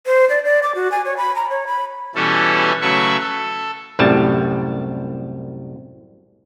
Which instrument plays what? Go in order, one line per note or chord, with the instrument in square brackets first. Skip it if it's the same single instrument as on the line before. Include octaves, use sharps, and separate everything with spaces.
[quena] C5
D5
D5
D6
F#4
G#5
C#5
B5
A#5
C#5
B5
[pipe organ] B2 E3 G3 C#4 E4 A4
C#3 F#3 A3 B4 E5 C#6
A4
[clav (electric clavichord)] C2 F#2 A2 G3 A5